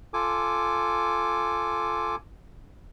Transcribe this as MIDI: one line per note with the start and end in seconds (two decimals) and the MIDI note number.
0.14 2.16 65
0.14 2.16 69
0.14 2.16 80
0.14 2.16 86